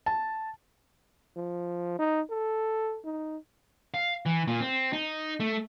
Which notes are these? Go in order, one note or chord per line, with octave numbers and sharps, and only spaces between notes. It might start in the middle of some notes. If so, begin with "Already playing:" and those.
A5
F3
D#4
A4
D#4
F5
E3
A#2
C4
D#4
A3